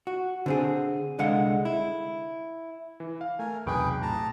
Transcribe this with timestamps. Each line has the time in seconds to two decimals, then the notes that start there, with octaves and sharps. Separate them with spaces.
0.07 F#4
0.46 D3 C4 G#4
1.19 C2 D3 G#3 F5 F#5
1.65 E4
3.00 E3
3.21 F5
3.39 A3 A#4 G#5
3.67 B1 E2 C3 G#4 B4 G5 C#6 D7
4.02 A2 A5 A#5